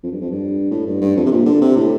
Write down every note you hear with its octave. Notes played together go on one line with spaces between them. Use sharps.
F2
G2
F2
G2
A2
G2
G2
F2
C3
A#2
D3
C3
A2